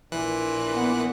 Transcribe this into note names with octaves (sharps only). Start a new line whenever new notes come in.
A#1 A#2 E3 F#6
B3 F#5